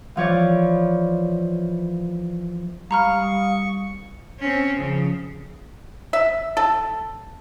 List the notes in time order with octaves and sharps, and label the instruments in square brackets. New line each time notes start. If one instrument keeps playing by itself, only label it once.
[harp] E3 F3 C#5 D5
[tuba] G3 [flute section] F5 D#6 [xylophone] A#5 B5 F6 [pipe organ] C#6
[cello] C4 C#4
C#3 F3
[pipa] E5
A4